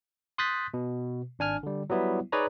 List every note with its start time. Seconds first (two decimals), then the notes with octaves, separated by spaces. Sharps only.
0.38 C6 D#6 F#6 G6 A6 B6
0.74 B2
1.39 G#1 D4 G#5 F6
1.63 D3 G3
1.90 F#3 G3 B3 E4
2.32 D#4 G#4 B4 C#5 D5 A#5